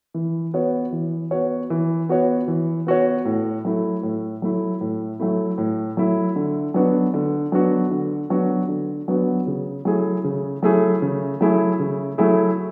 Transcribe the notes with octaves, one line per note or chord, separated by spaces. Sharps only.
E3
B3 F#4 C#5
E3
B3 F#4 C#5
E3
B3 F#4 C#5
E3
B3 F#4 C#5
A2
F#3 A3 E4
A2
F#3 A3 E4
A2
F#3 A3 E4
A2
F#3 A3 E4
D3
F#3 B3 D4 F#4
D3
F#3 B3 D4 F#4
D3
F#3 B3 D4 F#4
D3
F#3 B3 D4 F#4
C#3
F#3 A3 E4 G#4
C#3
F#3 A3 E4 G#4
C#3
F#3 A3 E4 G#4
C#3
F#3 A3 E4 G#4